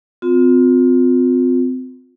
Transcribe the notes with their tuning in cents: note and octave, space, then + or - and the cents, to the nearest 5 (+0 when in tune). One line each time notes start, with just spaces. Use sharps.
C4 -30 F4 +30